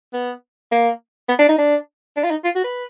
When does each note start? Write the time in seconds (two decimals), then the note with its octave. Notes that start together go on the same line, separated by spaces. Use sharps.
0.13 B3
0.72 A#3
1.29 B3
1.39 D4
1.49 D#4
1.58 D4
2.17 D4
2.24 F4
2.30 D#4
2.44 F4
2.55 F#4
2.64 B4